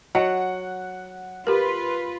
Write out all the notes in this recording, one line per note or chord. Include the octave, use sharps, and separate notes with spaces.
F#3 D#5 F#5
F4 G4 A#4 B4